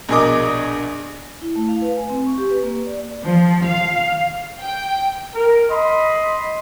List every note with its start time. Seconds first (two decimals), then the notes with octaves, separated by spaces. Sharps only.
0.09 A#1 B2 G#4 A#4 D#5 D6
1.42 E4
1.56 A3
1.68 F5
1.82 B4
1.97 G#5
2.10 C4
2.26 C#6
2.38 G4
2.50 B4
2.63 A#3
2.86 D5
3.25 F3
3.67 F5
4.61 G5
5.35 A#4
5.69 D#5 B5 C6